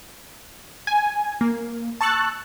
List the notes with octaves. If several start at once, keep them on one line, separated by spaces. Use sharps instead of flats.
G#5
A#3
A5 C#6 E6 F#6 A6